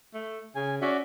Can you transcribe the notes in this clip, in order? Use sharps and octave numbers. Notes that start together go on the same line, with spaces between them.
A3
C#3 G#5
C#4 F#4 D5 E5